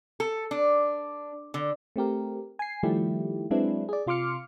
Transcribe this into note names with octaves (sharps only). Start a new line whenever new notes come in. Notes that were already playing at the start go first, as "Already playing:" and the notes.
A4
D4
D3
A3 C4 G4 A#4
G#5 C7
D#3 F3 G3 A3 E4 G4
F#3 G#3 C4 D4 E4 B4
G#4 D5
C3 F4 C6 D6 F6 C#7